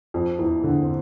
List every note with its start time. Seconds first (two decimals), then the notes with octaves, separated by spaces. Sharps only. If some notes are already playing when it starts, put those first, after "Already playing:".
0.14 F2 F3
0.39 E2 E3
0.64 D3
0.82 C4